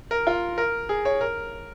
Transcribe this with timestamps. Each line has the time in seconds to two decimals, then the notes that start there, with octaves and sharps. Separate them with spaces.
0.11 A#4
0.27 F4
0.58 A#4
0.89 G#4
1.05 C#5
1.21 A#4